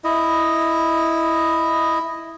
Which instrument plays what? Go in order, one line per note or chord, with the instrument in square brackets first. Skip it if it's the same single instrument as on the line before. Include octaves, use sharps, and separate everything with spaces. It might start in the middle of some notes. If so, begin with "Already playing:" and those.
[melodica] E4 D#5